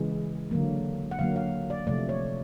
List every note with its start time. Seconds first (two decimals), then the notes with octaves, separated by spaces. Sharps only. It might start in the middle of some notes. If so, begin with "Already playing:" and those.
Already playing: C#3 E3 G#3
0.51 D3 F#3 A#3
1.11 F#5
1.19 D3 F#3 A#3 F5
1.36 F5
1.70 D5
1.87 C3 F3 A3 D5
2.09 C#5